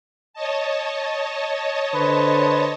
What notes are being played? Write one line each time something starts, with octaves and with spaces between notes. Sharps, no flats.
C#5 D#5 A5
D3 B4 C5